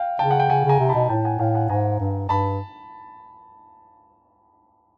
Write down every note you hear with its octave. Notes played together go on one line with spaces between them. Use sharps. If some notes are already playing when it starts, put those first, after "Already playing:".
Already playing: F5 G5
C#3 G5 A5
F#5
G5
C#3 F#5 G#5
C#3 G#5 A#5
C3
A5 B5
B2
A2 G5 A5
F#5 G#5
A2 F5 G5
F#5 G#5
G#2 G#5 A#5
G2
G2 A5 B5